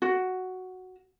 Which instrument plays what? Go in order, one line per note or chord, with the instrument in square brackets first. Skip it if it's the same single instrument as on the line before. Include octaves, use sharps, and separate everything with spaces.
[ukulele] F#4